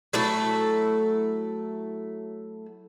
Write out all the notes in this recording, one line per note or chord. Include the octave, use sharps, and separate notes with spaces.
F#3 A3 E4 A4